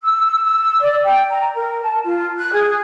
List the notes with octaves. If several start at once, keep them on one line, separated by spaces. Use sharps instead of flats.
E6
E6
D5
G5
A#5
A#4
A5
F4
F#6
G#4